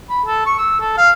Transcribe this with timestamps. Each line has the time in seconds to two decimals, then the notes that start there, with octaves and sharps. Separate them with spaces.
0.10 B5
0.26 A4
0.46 C#6
0.58 E6
0.80 A4
0.97 F5